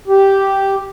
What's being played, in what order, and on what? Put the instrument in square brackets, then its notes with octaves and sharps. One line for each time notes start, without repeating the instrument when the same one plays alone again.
[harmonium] G4